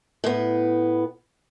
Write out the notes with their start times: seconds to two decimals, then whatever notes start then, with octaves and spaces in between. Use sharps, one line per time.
0.24 A2 B3